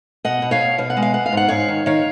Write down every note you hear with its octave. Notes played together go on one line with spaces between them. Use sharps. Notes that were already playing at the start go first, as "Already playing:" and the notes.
B2 D#5 F#5
B2
C#5 F5
B2
B2 F5
F#5
G#3
F5
B3 F#5
F5
G#2 F#5
G#2 C#5 F5
D#3
D#3 C#5 F5